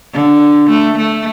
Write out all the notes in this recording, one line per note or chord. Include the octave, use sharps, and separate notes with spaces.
D3
A3
A3